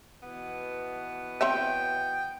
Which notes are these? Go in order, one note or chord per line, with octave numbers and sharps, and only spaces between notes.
B2 E3 B3
C4 C#5 E5 G5